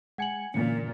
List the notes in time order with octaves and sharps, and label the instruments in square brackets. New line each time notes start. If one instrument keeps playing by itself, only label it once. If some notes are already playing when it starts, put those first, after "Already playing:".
[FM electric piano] G#3 G#6 C#7 [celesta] F#5 G#5 F#7
[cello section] A#2 [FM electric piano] D3 E3 C#4 [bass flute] A#3 [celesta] C#7